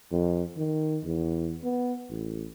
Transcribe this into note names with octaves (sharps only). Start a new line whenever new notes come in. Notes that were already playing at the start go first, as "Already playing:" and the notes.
F2
D#3
E2
B3
A1